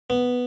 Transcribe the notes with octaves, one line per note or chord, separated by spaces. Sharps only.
B3